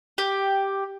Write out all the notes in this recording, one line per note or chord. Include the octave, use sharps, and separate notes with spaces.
G4